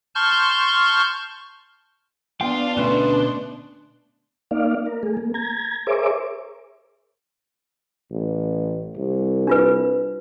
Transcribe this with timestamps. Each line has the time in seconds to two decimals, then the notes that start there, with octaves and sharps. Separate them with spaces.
0.15 A5 C6 C#6 F6 G6
2.41 B3 D4 F4 G5
2.77 D2 B2 A3 C#4 B4 C6
4.51 A#3 D#4 D5 F5
4.86 A#4
5.03 A3 G#4
5.17 A#3
5.34 A#5 G#6
5.87 G#4 A#4 C5 C#5 E5 D6
8.11 A1
8.97 C2
9.47 D4 F4 B4